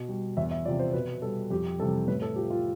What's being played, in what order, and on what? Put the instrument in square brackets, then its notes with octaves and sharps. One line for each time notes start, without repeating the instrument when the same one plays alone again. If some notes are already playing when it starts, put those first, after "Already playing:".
Already playing: [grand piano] B2
G3
E2 E5
E5
C3 F3 D5
C5
B2 B4
G3 A4
F2 G4
C3 E3 G3 A4
A2 B4
A4
F3 G4
F4